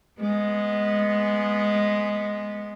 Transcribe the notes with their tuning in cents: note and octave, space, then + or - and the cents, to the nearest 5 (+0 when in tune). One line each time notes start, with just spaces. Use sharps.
G#3 +0 B3 -10